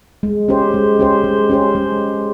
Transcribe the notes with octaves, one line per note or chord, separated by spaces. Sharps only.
G#3
C#4 G4 C5
G#3
C#4 G4 C5
G#3
C#4 G4 C5
G#3